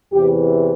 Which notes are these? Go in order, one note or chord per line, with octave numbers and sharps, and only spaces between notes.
E2 C3 E3 G4